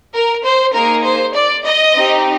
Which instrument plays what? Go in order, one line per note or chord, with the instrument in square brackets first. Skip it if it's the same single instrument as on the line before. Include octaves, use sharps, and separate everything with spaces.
[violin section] A#4
C5
A#3 D#4 G#4 A#4
C5
D5
D#5
C4 D#4 G4